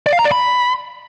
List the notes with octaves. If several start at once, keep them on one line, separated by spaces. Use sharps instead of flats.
D5
F5
A#5
D5
B5